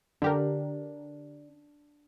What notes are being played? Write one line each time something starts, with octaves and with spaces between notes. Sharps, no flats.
D3 D4 G4 A#4